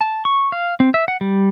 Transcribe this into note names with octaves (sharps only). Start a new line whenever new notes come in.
A5
C#6
F5
C4
E5
F#5
G3